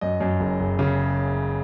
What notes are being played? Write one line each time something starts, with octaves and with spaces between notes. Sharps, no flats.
F#2 D#5
F#2
F#1
F#1
C#3